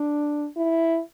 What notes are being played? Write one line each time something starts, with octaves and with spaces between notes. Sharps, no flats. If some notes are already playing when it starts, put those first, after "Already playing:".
Already playing: D4
E4